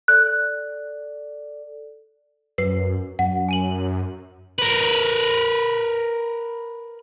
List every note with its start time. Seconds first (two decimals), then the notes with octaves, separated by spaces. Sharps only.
0.08 A4 D5 F#6
2.58 F#2 B4 C7
3.19 F#2 F#5
3.49 G#5 D#7 F#7
4.59 A#4 B4